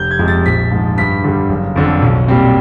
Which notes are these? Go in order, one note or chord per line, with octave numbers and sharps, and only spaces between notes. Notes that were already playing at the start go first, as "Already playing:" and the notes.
Already playing: F1 G6
G#6
F2 C3 F3 G#3
A6
A#1 B6
G#2 F3
G2 B6
D3 G3
F#1
F2 D3
B1
A#2 G3 C4